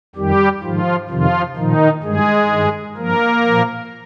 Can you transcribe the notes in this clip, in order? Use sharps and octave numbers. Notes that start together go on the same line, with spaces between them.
F2 D#3 G3 G4
G#2 D#3 F3 F4
F2 C3 D#3 F3 F4
A#2 D#3 F3 D#4
G2 D#3 G#3 G#4
G2 D#3
G2 F3 A#3 A#4
A#2 F3